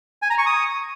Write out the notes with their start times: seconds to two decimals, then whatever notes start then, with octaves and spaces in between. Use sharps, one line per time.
0.22 G#5
0.30 A#5
0.38 C#6
0.46 D#6